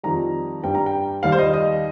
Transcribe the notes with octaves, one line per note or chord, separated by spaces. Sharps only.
F2 D#3 G3 A#5
G2 G3 G5
A#5
G5
D#2 D#3 G3 F5
C5
D#5
D#5